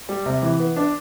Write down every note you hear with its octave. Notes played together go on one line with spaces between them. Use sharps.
G3
C3
E3
B3
D4